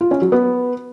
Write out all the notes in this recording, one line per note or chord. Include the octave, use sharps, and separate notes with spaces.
F4
C#4
F#3
B3